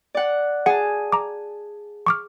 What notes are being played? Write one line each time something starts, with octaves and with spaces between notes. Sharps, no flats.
D5 F#5
G#4 F#5 A5
A#5 D6
C#6 D6 F6